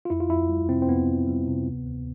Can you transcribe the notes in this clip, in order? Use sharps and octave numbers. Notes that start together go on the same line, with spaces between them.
F4
F2 E4
F4
F2 E4
G3
C3 C4
C4
F2 B3
F2
G3
C3
D2
D2